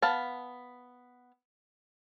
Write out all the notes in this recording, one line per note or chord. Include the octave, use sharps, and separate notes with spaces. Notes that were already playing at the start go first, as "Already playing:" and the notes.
B3 F5 A5